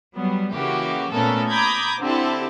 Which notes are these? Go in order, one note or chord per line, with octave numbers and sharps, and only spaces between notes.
F#3 G3 B3
C#3 E3 A#3 F#4 G4
A#2 A3 B3 C#4 A4 A#4
A#5 B5 D6 D#6 G6 G#6
D3 C4 E4 G4 A4